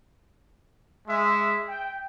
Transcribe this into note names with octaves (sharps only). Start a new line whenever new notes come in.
G#3 E5
G5